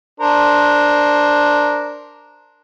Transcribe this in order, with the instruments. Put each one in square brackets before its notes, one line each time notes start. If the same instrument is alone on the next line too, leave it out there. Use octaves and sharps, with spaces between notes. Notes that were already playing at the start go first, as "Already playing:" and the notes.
[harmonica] D4 A#4 C5